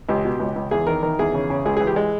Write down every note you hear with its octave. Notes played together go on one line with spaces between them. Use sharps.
C#2 G4
B2
C#2
C#2
E2 G#4
D#3 A#4
D#3 A#4
E2 G#4
C#3
C#3
C#2 G#4
E3 G#4
G4
G#3